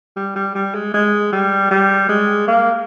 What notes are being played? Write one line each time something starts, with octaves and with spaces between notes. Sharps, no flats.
G3
G3
G3
G#3
G#3
G3
G3
G#3
A#3